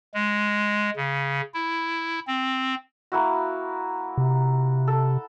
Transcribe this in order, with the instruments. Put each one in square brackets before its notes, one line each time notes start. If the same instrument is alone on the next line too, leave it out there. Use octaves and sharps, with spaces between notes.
[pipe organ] G#3
C#3
E4
C4
[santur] A#3 E4 F#4
[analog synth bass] C3
[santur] A4